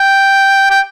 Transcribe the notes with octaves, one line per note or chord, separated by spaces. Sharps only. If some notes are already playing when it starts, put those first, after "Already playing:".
Already playing: G5
G5